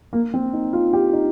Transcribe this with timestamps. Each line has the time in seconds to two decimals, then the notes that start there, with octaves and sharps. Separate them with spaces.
0.13 A#3
0.34 C4
0.53 D#4
0.73 F4
0.93 G4
1.13 D#4